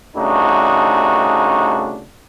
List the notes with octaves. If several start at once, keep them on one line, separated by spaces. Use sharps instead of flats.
C2 C#3 A3 D4 D#4 F#4